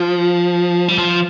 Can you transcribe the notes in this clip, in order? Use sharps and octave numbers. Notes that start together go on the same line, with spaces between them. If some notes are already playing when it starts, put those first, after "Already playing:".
Already playing: F3
G3
F3